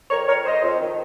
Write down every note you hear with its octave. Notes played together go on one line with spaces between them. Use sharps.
F2 A#4 C#5
F2 A#4 C#5
F2 C5 D#5
F2
D#3